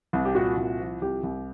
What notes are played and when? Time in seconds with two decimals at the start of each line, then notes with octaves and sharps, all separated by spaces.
0.13 C2
0.25 G4
0.35 A#2 F#4
0.57 C2
0.79 F3
1.02 C2 G4
1.23 C2